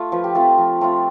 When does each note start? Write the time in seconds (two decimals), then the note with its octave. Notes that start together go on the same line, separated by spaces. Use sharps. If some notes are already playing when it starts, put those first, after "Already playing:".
Already playing: A3 F4 A4
0.12 F3 B4
0.24 G4
0.35 A3 C4 F4 A4
0.58 F3
0.81 A3 C4 F4